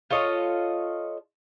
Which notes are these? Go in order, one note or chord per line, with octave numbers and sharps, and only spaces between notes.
F4 A4 C#5 D#5